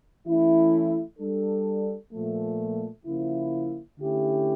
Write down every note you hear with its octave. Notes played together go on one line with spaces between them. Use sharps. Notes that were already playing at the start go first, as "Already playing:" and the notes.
E3 A3 C#4 E4
G3 D4 A4
A#2 F3 A3
C#3 F3 A#3 E4
D3 A3 C#4 E4 G4